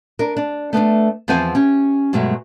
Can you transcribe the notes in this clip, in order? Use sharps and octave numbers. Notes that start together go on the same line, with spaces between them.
D4 A#4
D4
A3 B3 C4 D4
E2 F3 C4 C5 F#5 G#5
C#4 G4
G2 B2 F#3 G#3 A3